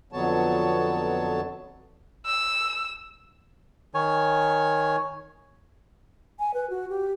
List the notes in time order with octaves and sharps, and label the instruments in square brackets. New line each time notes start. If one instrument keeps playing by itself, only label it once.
[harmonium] F2 D3 F#3 B3 C#5 A5
[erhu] E6
[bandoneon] D#3 C#5 G#5
[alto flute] G#5
B4
F#4
G4